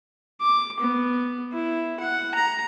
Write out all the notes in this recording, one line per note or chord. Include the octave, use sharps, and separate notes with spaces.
D6
B3
E4
F#5
A#5